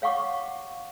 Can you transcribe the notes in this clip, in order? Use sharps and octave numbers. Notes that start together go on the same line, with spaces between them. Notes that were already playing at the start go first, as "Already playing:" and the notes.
C#5 F5 F#5 C#6 D6